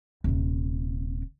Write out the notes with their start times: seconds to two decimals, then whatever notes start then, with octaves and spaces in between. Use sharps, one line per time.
0.24 D#1 C3